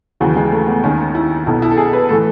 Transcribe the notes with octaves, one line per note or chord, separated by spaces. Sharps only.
D#2 C#3 E3 F#3
G#3
A3
B3
D#2 D#3 C#4
E4
B1 B2 E4
E4
A4
G#4
B4
A2 E3 A4